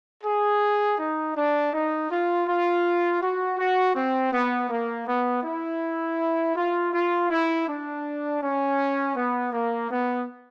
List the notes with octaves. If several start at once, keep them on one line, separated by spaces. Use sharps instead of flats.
G#4
D#4
D4
D#4
F4
F4
F#4
F#4
C4
B3
A#3
B3
E4
F4
F4
E4
D4
C#4
B3
A#3
B3